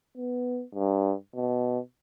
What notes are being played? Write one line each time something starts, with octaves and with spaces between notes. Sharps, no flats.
B3
G2
B2